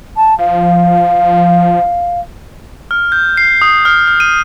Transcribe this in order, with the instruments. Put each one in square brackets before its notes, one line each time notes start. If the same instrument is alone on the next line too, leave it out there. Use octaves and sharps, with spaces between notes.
[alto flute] A5
[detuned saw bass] F3 [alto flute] F5
[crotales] F6
G6
C7
D#6
F6
F6
D#7